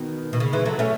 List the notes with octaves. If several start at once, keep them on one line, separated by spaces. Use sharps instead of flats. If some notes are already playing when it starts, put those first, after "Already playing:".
Already playing: B2 D#3
B2
C#3
E3 G#3
F#3 A3
A3 C#4